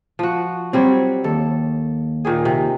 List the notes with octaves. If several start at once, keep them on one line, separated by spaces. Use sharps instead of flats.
F3 F#4
F#3 G3 C4 C#5
D#2 A4
A#2 D#3 G#4
C3